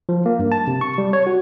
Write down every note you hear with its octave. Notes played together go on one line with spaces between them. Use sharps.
F3
A#3
G2
A5
C3
C#6
G3
C#5
F#4